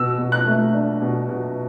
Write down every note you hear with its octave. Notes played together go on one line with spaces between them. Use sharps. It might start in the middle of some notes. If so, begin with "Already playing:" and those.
Already playing: B2 E6
B2
F#6
A3
D4
B2
B2